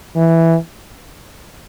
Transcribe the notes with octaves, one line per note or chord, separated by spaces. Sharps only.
E3